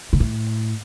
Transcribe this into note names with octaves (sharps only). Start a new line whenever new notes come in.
C3
A2